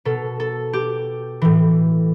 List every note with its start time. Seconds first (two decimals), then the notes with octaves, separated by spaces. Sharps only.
0.05 B2 A4
0.40 A4
0.73 G4
1.42 A2 E3